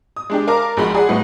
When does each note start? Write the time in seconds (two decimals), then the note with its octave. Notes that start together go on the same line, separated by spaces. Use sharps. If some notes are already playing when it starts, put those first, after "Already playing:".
0.16 D#6
0.30 G#3 D4 G4
0.48 A#4 F5 A5 A#5 D6
0.77 A#1 G#3 F#4 B5 C6
0.95 G#4 D5 F#5
1.09 A2 F#3 B4 D#5 F#5